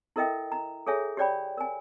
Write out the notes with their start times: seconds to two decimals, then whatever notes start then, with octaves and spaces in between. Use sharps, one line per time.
0.16 E4 A4 A#4 D#5 E5 G5
0.52 A#5
0.87 G#4 A4 C#5 E5 G#5
1.17 G4 C#5 D5 G5 B5
1.57 A#4 G#5